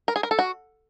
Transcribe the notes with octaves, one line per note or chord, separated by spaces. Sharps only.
A#4
G#4
A#4
A4
F#4